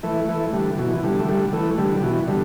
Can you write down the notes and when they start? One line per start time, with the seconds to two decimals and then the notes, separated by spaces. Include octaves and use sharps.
0.03 E3 A3
0.29 E3 A3
0.53 D3 G3
0.78 B2 E3
0.93 E3
1.03 D3 G3
1.19 A3
1.28 D3 G3
1.53 E3 A3
1.78 D3 G3
1.97 G3
2.03 B2 E3
2.28 D3 G3